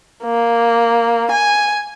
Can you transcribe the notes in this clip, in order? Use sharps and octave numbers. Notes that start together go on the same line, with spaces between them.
A#3
G#5